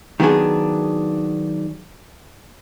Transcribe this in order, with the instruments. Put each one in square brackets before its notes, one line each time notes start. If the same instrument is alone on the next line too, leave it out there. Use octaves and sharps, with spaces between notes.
[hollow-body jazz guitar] D#3 F#3 B3 D4 G#4